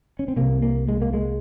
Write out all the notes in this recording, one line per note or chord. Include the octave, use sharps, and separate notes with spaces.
C#4
C4
C2 C3 A#3
A#3
G#3
A#3
G#3